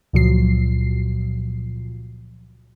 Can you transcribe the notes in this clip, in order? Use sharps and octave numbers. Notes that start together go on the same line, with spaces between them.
C#2 A#2 F3 F#3 C7